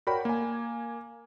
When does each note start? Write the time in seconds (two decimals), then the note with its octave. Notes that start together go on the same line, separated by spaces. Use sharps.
0.07 F#4 A#4 C#5 D5 G5 B5
0.25 A#3 G#5